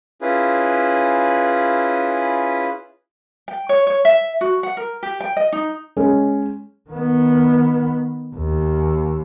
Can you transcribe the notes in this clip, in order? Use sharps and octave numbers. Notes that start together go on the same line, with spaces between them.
C#4 E4 F4 G#4 B4
G5
C#5
C#5
E5
F#4
F#5
A#4
G4
G5
D#5
D#4
G#3 C#4 G#4
D#3 B3
D#2